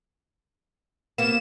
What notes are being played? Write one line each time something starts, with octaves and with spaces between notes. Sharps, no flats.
C3 A#3 B3 E7